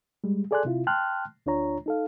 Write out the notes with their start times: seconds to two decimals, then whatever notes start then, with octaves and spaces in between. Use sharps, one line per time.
0.24 G3 G#3
0.51 G#4 A4 D5 G#5 C6 F#6
0.65 C3 E4 F4
0.87 G5 A5 C6 F6 F#6
1.46 D2 D4 F4 C#5 A#5
1.86 D#4 A4 F5